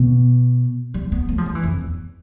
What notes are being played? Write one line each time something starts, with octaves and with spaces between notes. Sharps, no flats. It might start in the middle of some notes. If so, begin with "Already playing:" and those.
Already playing: B2
G3
B3
A3
F3
G3
E3
F2
E2